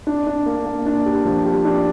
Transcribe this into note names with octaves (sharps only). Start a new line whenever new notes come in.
D4
D4
A#3
A#3
D4
G4
F3
G4
D4